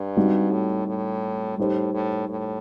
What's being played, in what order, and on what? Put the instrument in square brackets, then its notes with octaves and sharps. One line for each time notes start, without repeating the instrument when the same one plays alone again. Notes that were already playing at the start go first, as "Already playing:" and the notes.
Already playing: [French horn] G2
[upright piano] G3 C4 D#4 F#4
[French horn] A2
A2
[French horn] A2 [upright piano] G3 D#4 G4 C5
[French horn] A2
A2